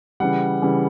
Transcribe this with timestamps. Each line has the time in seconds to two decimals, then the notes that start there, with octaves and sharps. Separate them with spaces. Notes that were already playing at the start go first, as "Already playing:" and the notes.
0.20 C#3 E3 G3 F#5
0.62 C#3 E3 G3